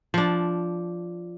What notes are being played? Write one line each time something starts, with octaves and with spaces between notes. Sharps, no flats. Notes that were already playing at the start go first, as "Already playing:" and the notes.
F3 D4